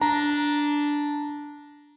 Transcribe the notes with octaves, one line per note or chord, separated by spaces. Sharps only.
D4 A#5